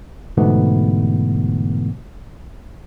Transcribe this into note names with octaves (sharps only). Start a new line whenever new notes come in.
G#2 B2 D3 E3 A3 B3